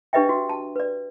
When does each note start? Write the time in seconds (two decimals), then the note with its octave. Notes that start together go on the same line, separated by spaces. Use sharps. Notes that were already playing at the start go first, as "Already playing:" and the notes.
0.13 D4 G4 B4 D#5 E5 G5
0.29 F#4
0.49 A5
0.76 B4 D5